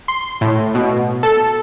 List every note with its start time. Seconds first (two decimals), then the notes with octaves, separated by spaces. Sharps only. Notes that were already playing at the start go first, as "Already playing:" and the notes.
0.08 C6
0.41 A2
0.75 B2
1.23 A4